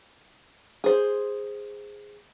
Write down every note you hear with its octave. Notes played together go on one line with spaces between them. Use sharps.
G#4 C5